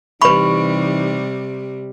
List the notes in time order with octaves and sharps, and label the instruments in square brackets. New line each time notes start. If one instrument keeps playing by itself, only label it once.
[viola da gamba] C3 G3 [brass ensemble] E3 D#4 [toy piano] B4 B5 [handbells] C#6